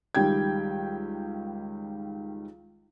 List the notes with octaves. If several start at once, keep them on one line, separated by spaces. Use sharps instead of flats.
C#2 D#3 G3 G5 G#6